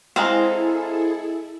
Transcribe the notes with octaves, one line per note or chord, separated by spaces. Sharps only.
G#3 C4 E4 G#4 A4 C5 F5 A#5